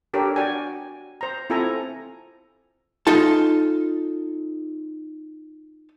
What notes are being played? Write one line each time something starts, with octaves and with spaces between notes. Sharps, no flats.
D4 G4 A4 A#4 C#5
F#4 D5 G5 G#5
C5 A#5
C4 E4 F4 A4 G#5 A#5
D#4 F4 A4 A5